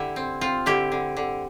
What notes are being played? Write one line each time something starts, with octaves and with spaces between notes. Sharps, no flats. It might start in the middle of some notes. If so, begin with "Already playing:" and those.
Already playing: D3 E4 G4
C4
C4 F4
D3 E4 G4
D3
D3